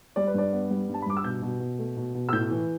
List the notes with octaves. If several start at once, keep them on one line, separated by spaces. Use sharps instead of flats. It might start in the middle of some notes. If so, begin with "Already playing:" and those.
G3 D5
B4
G2 D5
B3
G3
G2
A5
B5
G2 D6
E6
B2 G6
B2
B2
A3
B2
B2
E6
A2 G6
E3